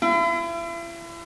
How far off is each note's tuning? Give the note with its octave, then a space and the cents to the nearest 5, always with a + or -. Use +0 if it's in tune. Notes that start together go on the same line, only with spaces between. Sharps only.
E4 +40